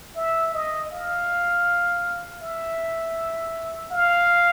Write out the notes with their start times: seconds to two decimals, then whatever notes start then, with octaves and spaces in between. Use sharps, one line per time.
0.16 E5
0.53 D#5
0.91 F5
2.41 E5
3.92 F5